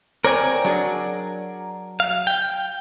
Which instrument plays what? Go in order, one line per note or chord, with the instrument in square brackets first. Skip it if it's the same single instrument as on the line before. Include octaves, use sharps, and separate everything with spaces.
[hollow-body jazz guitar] C4 C#5 [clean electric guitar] A#4 D5 G#5
[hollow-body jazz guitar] F#3 D4 G#4
[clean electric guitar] F5
G5